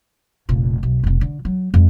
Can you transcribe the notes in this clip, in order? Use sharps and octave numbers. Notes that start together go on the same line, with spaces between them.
F1 A#1
B1
F1 C3
D3
F#3
F2 G#3